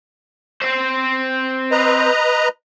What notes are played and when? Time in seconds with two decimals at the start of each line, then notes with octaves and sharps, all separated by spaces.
0.62 C4 C5
1.71 B4 D#5 A#5